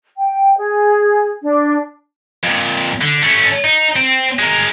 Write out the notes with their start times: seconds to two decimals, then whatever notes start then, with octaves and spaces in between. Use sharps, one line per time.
0.18 G5
0.58 G#4
1.43 D4
2.44 F2 A#2
3.01 D3
3.23 A3 C#4
3.64 D#4
3.96 C4
4.39 G#3 A#4